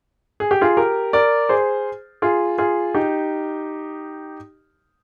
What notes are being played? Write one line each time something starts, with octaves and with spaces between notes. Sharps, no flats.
G#4
G4
F4 G#4
G4 A#4
A#4 D5
G#4 C5
F4 G#4
F4 G#4
D#4 G4